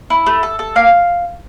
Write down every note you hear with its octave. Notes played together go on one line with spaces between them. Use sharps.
E4
A3
A4
A4
A#3 F5